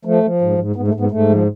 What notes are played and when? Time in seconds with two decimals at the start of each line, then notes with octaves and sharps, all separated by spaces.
0.05 F3 A3
0.23 F3
0.41 G#2
0.58 G#2
0.76 G#2 B3
0.88 A3
0.94 G#2
1.00 B3
1.11 G#2 A3
1.29 F3